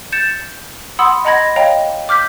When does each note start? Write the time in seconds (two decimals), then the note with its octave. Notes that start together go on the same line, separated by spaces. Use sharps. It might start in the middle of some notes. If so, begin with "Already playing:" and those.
0.12 G6 A6 C#7 E7
0.99 F#5 B5 C6 D#6 E6
1.25 D#5 F#5 A#5 B5 G#6 A#6
1.56 C#5 D#5 F5 G5 A#5
2.09 D6 F6 G6 B6